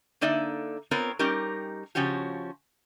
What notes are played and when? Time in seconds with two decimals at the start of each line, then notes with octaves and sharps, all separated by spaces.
0.21 D3 A#3 D#4 D5 E5
0.91 B3 C4 F4 A#4 C#5
1.19 G3 C#4 D#4 G4 A#4
1.95 C#3 F3 C#4 F#4 G4